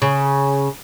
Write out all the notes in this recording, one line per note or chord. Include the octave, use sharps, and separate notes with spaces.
C#3